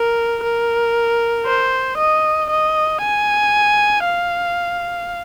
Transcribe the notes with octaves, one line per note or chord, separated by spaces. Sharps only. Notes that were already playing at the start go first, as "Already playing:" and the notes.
Already playing: A#4
A#4
C5
D#5
D#5
G#5
F5